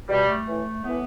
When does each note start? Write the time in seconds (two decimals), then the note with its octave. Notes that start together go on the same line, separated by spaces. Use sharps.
0.08 B2 G3
0.27 A3
0.47 A2 E3
0.84 A2 E3 B3